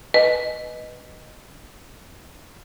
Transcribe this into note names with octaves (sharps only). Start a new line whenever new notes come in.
B4 D#5